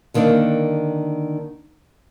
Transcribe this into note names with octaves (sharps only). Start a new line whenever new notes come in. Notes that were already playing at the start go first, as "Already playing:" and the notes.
D3 D#3 A#3 C4 D4